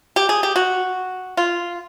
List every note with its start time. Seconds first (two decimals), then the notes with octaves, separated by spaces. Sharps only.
0.16 G4
0.29 G#4
0.43 G4
0.56 F#4
1.37 F4